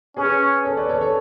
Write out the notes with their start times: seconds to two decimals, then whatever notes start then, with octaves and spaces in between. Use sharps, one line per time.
0.17 C#4 G#4 B4
0.64 A4 C#5
0.77 B4 D5
0.89 A4 C#5
1.01 A4 C#5